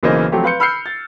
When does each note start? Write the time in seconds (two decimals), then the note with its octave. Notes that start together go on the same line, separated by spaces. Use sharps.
0.03 B1 C#3 E3 A#3 C5 D#5
0.32 F3 F#3 A3 C4 G4
0.44 B4 F5 C6 G6 C#7
0.60 B5 E6 F6 G6 C7 C#7
0.86 A6